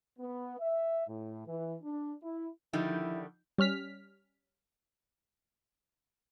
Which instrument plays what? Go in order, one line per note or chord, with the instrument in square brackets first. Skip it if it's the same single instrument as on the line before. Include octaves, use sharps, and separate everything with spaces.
[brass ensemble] B3
E5
A2
E3
D4
E4
[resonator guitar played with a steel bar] D3 D#3 G3 [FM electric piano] F3 D#4 G6 [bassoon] E4
[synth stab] G3 C#4 F6 B6